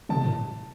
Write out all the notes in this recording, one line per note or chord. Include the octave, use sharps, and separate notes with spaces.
C3 A5
A2